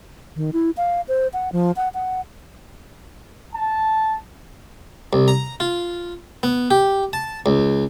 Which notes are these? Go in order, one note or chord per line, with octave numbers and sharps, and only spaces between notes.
D#3
E4
F5
C5
F#5
F3
F#5
F#5
A5
C2
A#5
F4
B3
G4
A5
C#2